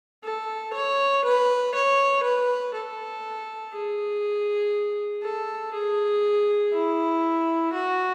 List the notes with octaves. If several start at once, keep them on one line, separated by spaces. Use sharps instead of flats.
A4
C#5
B4
C#5
B4
A4
G#4
A4
G#4
E4
F#4